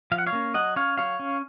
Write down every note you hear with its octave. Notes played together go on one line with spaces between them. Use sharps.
F3 F5
F#5
C#5 F5
A#3 C#4
F#3 D#5 F#5
C#4 C#5 F5
F#3 C#5 F5
C#4